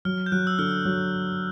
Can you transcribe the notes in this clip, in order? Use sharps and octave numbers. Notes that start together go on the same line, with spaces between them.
F#3 F6
G6
F#3 F#6
E6
D3 F6
F#3